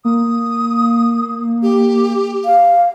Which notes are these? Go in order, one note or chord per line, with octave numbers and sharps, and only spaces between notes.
A#3 D#6
G4
F5